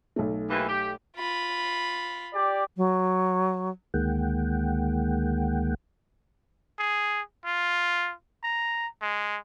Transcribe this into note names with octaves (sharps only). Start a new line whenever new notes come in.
B1 A3
D#2 E3
G4
F4 B5
G4 D5
F#3
D2 D#3 G#3 A#3 F#5 G5
G#4
F4
A#5
G#3